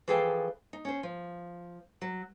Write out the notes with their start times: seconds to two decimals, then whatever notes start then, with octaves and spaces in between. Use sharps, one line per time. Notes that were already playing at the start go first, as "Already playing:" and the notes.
0.08 E3 F3 G#4 A4 F5 G5
0.73 D#4
0.85 C#4 C5
1.03 F3
2.01 F#3